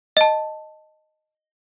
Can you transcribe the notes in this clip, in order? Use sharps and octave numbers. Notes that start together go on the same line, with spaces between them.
D#5 A5